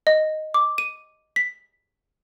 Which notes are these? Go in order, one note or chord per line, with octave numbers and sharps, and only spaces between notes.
D#5
D6
D#7
B6